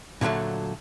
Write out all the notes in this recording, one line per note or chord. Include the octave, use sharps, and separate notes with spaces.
A#2 D3 E3 F#3 A3